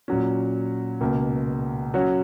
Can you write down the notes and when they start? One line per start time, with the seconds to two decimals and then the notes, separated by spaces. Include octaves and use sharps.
0.08 A#2 F#3 C#4
1.01 C#2 B2 A#3
1.94 F#3 C#4 F#4 C#5